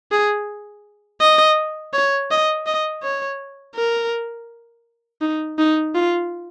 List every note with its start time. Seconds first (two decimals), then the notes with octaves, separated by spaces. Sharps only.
0.12 G#4
1.21 D#5
1.94 C#5
2.31 D#5
2.66 D#5
3.03 C#5
3.76 A#4
5.22 D#4
5.59 D#4
5.95 F4